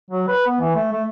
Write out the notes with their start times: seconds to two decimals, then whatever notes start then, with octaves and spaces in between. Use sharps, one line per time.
0.11 F#3
0.28 B4
0.47 B3
0.60 E3
0.75 A3
0.92 A3